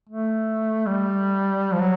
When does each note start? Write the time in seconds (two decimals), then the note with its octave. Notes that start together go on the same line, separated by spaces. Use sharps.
0.09 A3
0.86 G3
1.73 F3
1.80 F#3